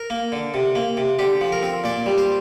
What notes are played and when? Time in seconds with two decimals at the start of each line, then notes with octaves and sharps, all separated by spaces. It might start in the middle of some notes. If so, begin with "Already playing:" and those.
Already playing: A#4
0.10 A#3
0.32 D3
0.54 C3
0.75 A#3
0.97 C3
1.19 D3 G4
1.41 F3
1.52 A#4
1.63 C4
1.84 A#2 D5
2.06 G3
2.18 C5